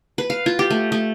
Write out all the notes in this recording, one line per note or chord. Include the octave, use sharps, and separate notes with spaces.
B4
F5
F4
G4
A3
A3